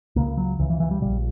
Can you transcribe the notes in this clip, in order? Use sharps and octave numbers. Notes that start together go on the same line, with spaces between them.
C#2 C#3 A#3
F#3
C#2 C#3 E3
E3
E3
G3
A#1 A#2 G3